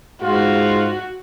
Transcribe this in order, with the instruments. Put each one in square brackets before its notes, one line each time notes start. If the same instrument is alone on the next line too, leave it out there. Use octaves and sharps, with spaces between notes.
[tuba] G#2 [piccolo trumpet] F4 [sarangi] F#4